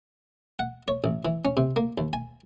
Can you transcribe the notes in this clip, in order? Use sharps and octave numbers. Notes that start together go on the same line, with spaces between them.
F#5
C#5
A1
E3
C#4
C3
A#3
D#2
G#5